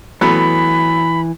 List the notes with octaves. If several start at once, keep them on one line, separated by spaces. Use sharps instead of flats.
E3 F#3 A3 B3 B5